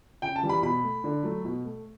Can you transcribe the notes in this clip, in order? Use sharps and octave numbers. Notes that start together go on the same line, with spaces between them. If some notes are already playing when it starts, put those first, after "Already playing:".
C#3 G5
A5
E3 G3
B5
B2 B5
A3
D3
F#3 A3
B2
A3